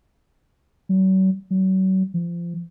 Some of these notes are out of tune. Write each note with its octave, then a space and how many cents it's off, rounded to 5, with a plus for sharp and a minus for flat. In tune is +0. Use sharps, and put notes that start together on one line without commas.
F#3 +40
F#3 +35
F3 -25